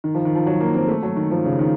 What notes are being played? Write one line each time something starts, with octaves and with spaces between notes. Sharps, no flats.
D#3
F3
D#3
F3
F#3
A#3
C4
A3
F#3
D#3
F3
C#3
D#3